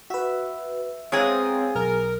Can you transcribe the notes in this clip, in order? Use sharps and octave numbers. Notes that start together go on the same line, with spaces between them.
F#4 B4 E5
G#3 B3 C4 G#4 C#5 F5 A#5 D#6
B1 A#4